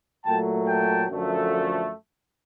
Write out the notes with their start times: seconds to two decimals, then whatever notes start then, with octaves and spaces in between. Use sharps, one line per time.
0.25 A#2 F#3 A3 G5 A5
0.67 G5 A5
1.09 F#2 D3 F3 A3